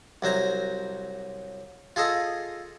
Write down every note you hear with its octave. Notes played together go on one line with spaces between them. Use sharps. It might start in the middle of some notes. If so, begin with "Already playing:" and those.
C2 F#3 C5 A#5
F4 G#4 A4 D#5 F5